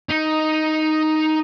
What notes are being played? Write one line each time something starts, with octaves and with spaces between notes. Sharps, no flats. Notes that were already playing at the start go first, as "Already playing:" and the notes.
D#4